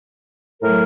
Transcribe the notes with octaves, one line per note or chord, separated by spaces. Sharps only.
A2 F#3 A3 A#4